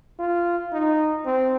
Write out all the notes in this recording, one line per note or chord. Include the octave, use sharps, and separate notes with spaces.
F4
D#4
C4